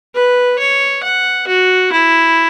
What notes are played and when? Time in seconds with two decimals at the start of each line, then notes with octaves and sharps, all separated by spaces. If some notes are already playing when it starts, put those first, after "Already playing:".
0.15 B4
0.59 C#5
1.03 F#5
1.48 F#4
1.92 E4